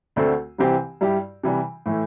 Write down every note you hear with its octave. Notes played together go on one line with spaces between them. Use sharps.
D2 D3 A3 C4 A4
C2 C3 E3 C4 G4
G2 G3 E4 G4
C3 E3 G3
A2 E3 A3